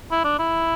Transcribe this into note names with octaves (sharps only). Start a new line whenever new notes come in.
E4
D4
E4